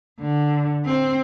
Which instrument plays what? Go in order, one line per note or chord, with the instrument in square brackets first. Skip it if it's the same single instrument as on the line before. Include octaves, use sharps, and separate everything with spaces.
[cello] D3
C4